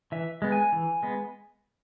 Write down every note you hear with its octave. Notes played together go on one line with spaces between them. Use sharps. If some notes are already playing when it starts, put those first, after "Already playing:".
E3 E5
G#3 B3
G#5
E3
G#3 B3